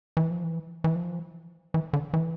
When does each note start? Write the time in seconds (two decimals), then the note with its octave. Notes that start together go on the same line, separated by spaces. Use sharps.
0.17 E3
0.31 F3
0.44 E3
0.84 E3
0.95 F3
1.74 E3
1.93 D3
2.14 E3